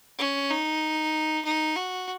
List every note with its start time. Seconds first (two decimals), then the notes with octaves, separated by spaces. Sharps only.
0.19 C#4
0.51 D#4
1.45 D#4
1.76 F#4